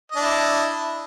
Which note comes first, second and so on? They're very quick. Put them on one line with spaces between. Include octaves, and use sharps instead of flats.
D#5 D4 E4